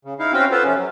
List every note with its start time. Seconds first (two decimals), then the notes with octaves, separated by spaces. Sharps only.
0.05 C#3
0.19 D#4 E4 F5
0.33 C4 C#4 F#4 F5 G5
0.51 B3 F4 A4 B4 C5
0.64 F2 C3 C#4
0.77 F#3